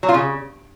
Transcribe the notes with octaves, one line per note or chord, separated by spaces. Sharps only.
F#3
F4
C#3